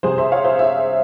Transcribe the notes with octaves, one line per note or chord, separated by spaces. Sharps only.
C3 G3 G#4 C5
C5 E5
C#5 F5
C5 E5
C5 E5